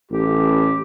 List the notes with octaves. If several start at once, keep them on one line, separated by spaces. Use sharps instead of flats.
A1 G4